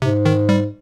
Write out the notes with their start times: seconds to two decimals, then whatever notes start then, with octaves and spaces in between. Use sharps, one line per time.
0.02 G#2 C3
0.25 D#3
0.49 G3